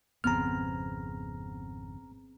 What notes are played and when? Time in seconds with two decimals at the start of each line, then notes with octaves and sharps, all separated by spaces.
0.24 G#1 F2 C#3 B3 C4 G#4 A#5 F6